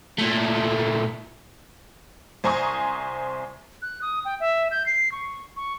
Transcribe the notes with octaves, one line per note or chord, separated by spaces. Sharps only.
A#2 A3
C2 C5 G#5 A#5 C#6 D#6
F#6
D#6
G5
E5
G6
C7
C#6
C#6